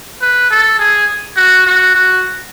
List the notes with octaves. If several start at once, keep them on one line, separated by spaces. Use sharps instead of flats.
B4
A4
G#4
F#4
F#4
F#4